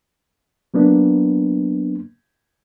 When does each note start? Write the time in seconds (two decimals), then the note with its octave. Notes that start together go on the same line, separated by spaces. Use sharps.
0.74 F#3 A#3 B3 D4